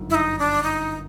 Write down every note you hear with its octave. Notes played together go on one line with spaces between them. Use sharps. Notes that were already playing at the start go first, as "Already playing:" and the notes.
Already playing: G1 F#2 D#3
E4
D#4
D4
D#4